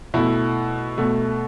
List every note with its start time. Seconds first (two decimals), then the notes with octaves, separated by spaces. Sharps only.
0.14 B2 A3 E4
0.98 B2 A3